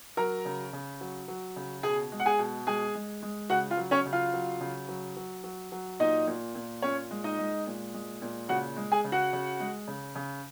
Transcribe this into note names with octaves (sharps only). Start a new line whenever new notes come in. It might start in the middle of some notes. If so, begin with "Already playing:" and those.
F#3 A#4 A#5
C#3
C#3
F#3
F#3
C#3
B2 G#4 G#5
G#3
F#5
G#4 G#5
B2
G#3 G#4 G#5
G#3
G#3
C#3 F#4 F#5
F4 F5
F#3
C#4 C#5
C#3
F4 F5
F#3
C#3
F#3
F#3
F#3
F#3
A#2 D#4 D#5
A#2
A#2
A#2 C#4 C#5
G#3
D#4 D#5
G#3
A#2
G#3
A#2
C#3 F#4 F#5
G#3
G#4 G#5
C#3
F#4 F#5
C#3
G#3
C#3
C#3